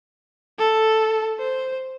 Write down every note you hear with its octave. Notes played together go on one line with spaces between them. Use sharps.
A4
C5